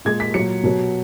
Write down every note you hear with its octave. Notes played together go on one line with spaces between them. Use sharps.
A#2 G#3 G#6
B6
A#2 F#3 C#7
B2 F#3